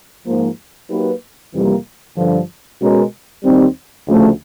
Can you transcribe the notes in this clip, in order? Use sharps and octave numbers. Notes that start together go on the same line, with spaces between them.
G#2 F3 A#3
F#3 A#3 D#4 G4 B4
F2 C3 E3 G3 A#3
G2 D3 F3
B2 G#3 C#4 F#4 A#4
D#2 D#3 G3 C4
D2 C#3 F3 A3